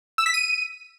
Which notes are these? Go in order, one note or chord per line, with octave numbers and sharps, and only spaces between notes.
E6
B6
D#7